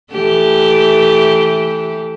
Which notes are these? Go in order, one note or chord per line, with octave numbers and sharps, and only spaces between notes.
E3 A3 G4